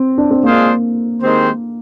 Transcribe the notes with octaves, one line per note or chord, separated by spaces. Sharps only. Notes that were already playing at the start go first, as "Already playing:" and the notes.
Already playing: C4
D4
C4
G#3 A#3 D4 F4 G#4 C5
D#3 G#3 C4 G4 C5